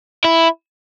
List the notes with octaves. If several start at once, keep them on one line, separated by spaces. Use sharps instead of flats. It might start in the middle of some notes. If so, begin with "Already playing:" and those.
E4